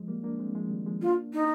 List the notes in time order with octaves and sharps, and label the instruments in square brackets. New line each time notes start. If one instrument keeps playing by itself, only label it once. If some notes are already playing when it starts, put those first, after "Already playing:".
Already playing: [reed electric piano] F3 G#3
G3 A#3
A#3 D4
G#3 C4
F3 G#3
D#3 G3
F3 G#3
[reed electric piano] A#3 D4 [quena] F4
[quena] D#4